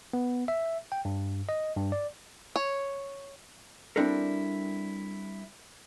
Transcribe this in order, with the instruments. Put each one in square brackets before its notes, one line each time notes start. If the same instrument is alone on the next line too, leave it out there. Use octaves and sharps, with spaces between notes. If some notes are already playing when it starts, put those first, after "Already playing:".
[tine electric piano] B3
E5
G5
G2
D#5
G2
D5
[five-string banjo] C#5
[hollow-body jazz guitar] G3 C4 D4 E4 A4 A#4